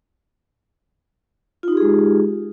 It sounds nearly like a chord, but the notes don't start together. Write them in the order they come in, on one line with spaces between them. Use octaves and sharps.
F4 D#4 G4 G#4 G#3